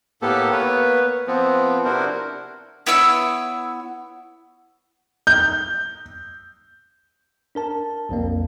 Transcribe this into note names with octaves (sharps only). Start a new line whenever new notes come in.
A2 A#3 B3 G4 A4
A#3 B3 B4 C#5
F3 B3 C4
C3 D4 E4 F#4 A#4 C5
B3 E4 C#5 E6
G6
D4 A#4 A5
B1 F2 A#3